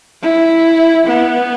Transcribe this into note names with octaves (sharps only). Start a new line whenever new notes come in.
E4
B3